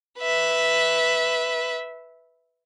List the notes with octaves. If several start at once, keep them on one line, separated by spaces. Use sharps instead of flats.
B4 E5